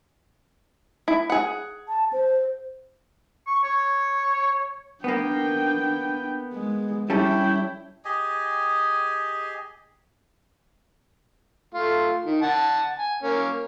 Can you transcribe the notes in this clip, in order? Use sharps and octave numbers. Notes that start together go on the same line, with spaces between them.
E4
G#4 F#5
A5
C5
C#6
C#5
A#3 B3 D4 G5
G#3
G3 C#4 E4 A4 G5
G4 G#4 D#5 G#5
A3 F4
D#3
F#5 A5
G#5
A#3 C#4